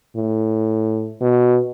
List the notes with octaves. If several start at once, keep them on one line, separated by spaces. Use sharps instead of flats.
A2
B2